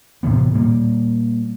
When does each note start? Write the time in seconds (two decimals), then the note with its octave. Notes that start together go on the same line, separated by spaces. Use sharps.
0.23 A2 C3 E3 B3
0.54 A#2 G3 A#3